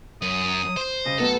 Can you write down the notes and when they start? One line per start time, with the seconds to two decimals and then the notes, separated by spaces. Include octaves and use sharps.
0.22 F#2 D#6
0.77 C5
1.06 C#3 G3 D#5
1.20 A2 F#3 B3 A4